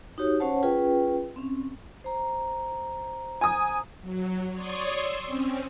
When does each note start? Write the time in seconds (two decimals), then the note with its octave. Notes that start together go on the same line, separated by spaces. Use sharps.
0.18 D#4 F#4 G4 C#5
0.40 C#4 C5 C#5 F#5 A5
0.63 C#4 F4 G#4 B4 G5
1.36 C4 C#4
2.04 C5 A#5
3.41 G#5 D#6
4.01 F#3
4.53 C#5 D5 C6 C#6 D#6
4.93 C6 E6
5.27 C4 C#4